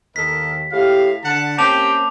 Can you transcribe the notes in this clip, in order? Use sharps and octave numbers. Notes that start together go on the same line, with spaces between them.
D#2 A4 A#4 D#5 B6
A2 G4 F5
D3 F#5 A5
A#3 C4 C#4 G4 A5 D6 F7